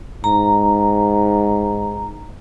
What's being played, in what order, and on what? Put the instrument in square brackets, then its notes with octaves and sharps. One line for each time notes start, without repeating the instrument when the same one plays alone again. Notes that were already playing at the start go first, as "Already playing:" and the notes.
[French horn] G#2 [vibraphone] A#5